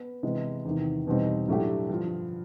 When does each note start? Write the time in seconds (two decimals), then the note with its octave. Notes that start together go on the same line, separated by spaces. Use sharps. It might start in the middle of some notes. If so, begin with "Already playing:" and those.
Already playing: B3
0.23 C3 E3 G#3 B3
0.65 E2 C3 D#3
1.06 E2 B2 G3 C4 D#4
1.48 A2 F#3 A3 D4 G4
1.89 G2 D3 F3